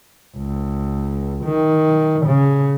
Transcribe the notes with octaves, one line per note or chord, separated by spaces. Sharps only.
C#2
D#3
C#3